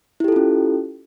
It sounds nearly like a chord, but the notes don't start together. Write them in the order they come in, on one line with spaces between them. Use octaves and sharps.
E4 G4 A4 F4 C#4